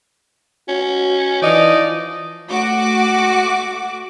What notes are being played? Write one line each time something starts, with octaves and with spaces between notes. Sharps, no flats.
C#4 F#4
E3 F3 D#4 D5 D#5
A3 F#4 D6